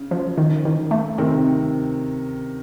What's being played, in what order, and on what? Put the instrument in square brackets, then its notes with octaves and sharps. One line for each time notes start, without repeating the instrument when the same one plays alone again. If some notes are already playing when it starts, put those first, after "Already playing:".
Already playing: [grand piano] C#3
[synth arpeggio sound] F3
D#3
D#3
A3
[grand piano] C3 D#3 [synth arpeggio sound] C4